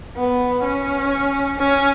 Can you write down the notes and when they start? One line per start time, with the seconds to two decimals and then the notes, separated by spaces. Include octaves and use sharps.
0.16 B3
0.64 C#4
1.58 C#4